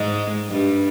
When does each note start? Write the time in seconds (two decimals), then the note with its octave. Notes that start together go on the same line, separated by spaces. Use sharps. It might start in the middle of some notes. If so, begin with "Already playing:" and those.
Already playing: G#2 G#3
0.49 G2 G3